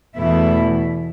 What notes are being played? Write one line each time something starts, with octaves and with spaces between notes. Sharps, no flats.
E2 B2 A3 E4